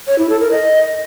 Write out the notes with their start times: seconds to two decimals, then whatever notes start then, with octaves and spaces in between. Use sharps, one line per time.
0.07 C#5
0.18 E4
0.29 A4
0.40 A#4
0.51 D#5